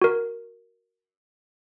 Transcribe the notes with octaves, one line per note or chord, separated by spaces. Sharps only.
F#4 A#4